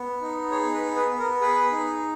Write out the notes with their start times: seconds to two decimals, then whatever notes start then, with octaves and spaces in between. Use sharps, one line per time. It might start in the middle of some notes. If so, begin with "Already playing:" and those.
Already playing: B3
0.21 D#4
0.51 G#4 C#5
0.74 B4
0.81 B3
0.96 B4
1.11 B3
1.19 A#4
1.41 G#4 B4
1.71 D#4